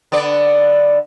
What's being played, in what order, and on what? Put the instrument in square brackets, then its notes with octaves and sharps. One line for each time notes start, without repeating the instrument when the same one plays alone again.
[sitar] D3 B3 D5